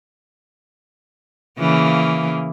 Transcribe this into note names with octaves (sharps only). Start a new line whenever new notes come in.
C#3 E3 A#3